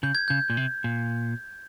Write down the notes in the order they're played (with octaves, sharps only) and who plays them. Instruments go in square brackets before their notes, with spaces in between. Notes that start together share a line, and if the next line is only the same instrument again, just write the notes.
[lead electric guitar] C#3 [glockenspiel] G6
[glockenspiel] G#6
[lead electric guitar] C#3 [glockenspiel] G6
[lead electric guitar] A#2
C3
A#2